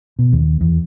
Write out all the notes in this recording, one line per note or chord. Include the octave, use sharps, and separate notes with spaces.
B2
D#2
E2